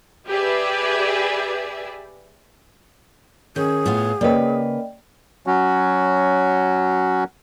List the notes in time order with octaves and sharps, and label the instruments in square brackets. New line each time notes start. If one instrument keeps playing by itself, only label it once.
[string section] G4 G#4 B4 D5 E5
[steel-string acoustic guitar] D#3 C#4 [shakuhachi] G#4 [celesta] G6
[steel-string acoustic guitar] A2 B3 F5 [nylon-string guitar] F4
[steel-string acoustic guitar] C#3 [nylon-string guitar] A#3 B4 [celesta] D5 D#5 G5
[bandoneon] F#3 C#4 F#4